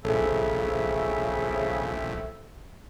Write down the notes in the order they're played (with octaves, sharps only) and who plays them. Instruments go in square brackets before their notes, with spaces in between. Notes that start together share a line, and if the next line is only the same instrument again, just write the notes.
[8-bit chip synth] A#1 [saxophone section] C#3 [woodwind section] G4 C5 E5 [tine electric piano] A4